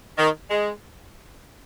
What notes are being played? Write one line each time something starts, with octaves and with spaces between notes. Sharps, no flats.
D#3
G#3